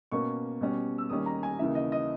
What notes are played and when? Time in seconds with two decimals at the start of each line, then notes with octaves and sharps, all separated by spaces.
0.11 B2 A#3 C#4 C#6
0.61 B2 G3 C#4
0.98 E6
1.09 D#2 D#3 G3 C#4 D#6
1.26 A#5
1.43 G#5
1.59 D#2 C#3 E3 E5
1.75 D#5
1.92 D#5